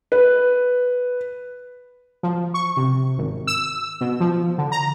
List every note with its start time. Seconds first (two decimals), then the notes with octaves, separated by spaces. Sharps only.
0.12 B4
2.23 F3
2.54 C#6
2.77 C3
3.18 G#1
3.47 E6
4.01 B2
4.20 F3
4.58 D3
4.72 A#5